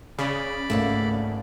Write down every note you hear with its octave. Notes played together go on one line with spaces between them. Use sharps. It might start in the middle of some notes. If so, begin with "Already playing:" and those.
C#3 D5 B5
G#1 C#2 A3 A#3 D4